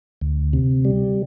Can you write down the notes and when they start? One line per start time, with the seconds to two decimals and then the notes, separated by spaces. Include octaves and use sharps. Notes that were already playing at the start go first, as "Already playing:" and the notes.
0.21 D2
0.53 C3
0.85 G3